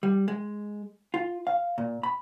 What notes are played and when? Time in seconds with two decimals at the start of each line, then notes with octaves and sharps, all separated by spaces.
0.03 G3
0.28 G#3
1.14 F4
1.47 F5
1.78 A#2
2.03 B5